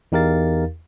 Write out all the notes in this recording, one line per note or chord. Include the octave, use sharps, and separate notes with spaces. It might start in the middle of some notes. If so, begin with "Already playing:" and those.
E2 D#4 G4 A#4 F5 A6